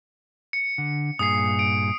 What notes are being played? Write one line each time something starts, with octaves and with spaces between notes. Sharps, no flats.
C#7
D3
G2 A#2 G#4 D#6 C7
D7